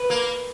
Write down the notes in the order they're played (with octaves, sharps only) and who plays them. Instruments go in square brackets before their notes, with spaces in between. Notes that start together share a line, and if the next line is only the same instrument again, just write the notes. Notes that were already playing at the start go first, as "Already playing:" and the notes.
Already playing: [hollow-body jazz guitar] B4
[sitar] A#3